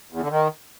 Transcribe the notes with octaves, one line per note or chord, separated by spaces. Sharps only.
E2
D3
D#3